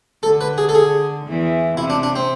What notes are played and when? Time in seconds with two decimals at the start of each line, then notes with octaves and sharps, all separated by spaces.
0.23 D3 A4
0.41 B4
0.58 G#4
0.69 A4
0.75 G#4
1.26 E2 E3
1.77 C3 E4
1.90 D4
2.03 D4
2.16 C4